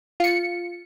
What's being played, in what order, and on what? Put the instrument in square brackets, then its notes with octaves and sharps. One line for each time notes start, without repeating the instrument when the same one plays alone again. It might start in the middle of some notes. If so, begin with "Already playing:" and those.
[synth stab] F4 C#7